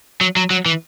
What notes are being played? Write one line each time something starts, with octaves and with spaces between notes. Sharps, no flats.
F#3
F#3
F#3
E3